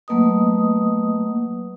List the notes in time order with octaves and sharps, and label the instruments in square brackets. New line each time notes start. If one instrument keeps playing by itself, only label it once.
[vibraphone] F#3 A3 A#3 B4 D#5 D#6